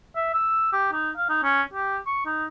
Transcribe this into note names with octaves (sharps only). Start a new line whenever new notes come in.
E5
E6
G4
D#4
F5
D#4
C#4
G4
C#6
D#4